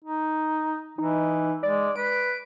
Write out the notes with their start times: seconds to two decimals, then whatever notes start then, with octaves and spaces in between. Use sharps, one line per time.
0.04 D#4
0.98 E3 D#4
1.63 G#3 D5
1.96 B4 D7